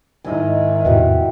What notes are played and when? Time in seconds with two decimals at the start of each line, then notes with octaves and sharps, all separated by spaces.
0.24 G#2 D#3 E4 D#5 G#5
0.85 E2 A2 C3 E3 F#4 G4